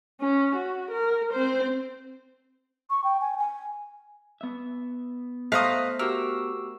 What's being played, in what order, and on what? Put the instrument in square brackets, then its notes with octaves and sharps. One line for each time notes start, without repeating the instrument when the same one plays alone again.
[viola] C#4
F#4
A#4
C4 C5
[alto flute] C#6
G5
G#5
G#5
[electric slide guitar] B3 E5
[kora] A3 C5 [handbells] D#5 F#6 B6 [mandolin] F5 A#5 D#6
[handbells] F#4 G4 E6 [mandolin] A#4